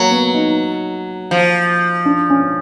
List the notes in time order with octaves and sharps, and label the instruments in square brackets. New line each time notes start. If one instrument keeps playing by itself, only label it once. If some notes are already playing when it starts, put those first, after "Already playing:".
Already playing: [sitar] F#3 [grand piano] A#3
[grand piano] B3
D#4
[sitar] F3
[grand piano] D4
C#4